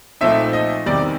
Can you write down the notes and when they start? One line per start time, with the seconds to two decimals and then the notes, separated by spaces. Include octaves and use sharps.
0.21 A#2 F3 A3 C4 D#4 E5
0.53 D#5
0.86 E2 C3 D#3 G3 D5